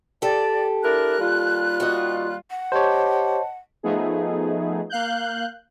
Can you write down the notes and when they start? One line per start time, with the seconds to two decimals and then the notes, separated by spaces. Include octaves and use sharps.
0.22 G4 A4 D5
0.84 D4 E4 A#4 F#6
1.19 D#2 G3 F4
1.80 F#4 D#5
2.50 F#5
2.72 G4 C5 C#5 D#5 A5
3.83 F3 A3 B3 D#4 G#4
4.90 A#3 F5 F#6 G6